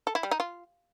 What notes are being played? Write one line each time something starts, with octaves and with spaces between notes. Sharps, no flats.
A4
E4
G3
D#4
F4